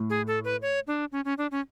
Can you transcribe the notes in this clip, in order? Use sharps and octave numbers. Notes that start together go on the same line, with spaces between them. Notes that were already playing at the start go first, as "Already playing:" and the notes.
Already playing: A2
G#4
A4
B4
C#5
D4
C#4
C#4
D4
C#4